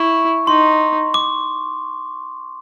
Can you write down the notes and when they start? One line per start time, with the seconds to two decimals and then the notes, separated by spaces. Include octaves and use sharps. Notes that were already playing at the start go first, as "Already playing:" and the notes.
Already playing: E4 C#6
0.47 D#4 C6
1.14 D6